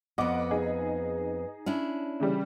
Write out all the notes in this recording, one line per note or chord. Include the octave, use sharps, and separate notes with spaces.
F2 B3 D#5 F#5 D6
D#4 G#4
C#4 D4 E4
C#3 E3 G3